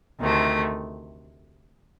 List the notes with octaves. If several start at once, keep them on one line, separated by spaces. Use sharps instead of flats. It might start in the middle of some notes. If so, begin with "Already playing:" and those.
D2 C3 D#3 A3